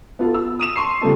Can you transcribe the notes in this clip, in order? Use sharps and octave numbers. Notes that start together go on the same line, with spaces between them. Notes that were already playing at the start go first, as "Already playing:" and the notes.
B3 F4 A4
E6
D#6 D#7 E7
A5 C6 C#6 C7
C#3 F3 G3 A3 B3 A4